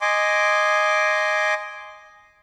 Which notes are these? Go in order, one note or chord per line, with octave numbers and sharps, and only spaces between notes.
D#5 G#5 C6 D6